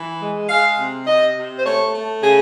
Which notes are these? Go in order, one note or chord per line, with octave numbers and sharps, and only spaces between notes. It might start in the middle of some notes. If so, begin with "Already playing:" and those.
Already playing: E3
G#3
G#3 F5
C3
C3 D#5
C3
C5
A3 C#5
A3
C#3 G#4